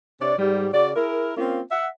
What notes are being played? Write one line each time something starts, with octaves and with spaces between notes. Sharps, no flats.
C3 D4 C#5 D5
G#2 G3
C#3 F#4 D5
E4 G#4 A#4
A#3 C4 C#4 F4
E5 F#5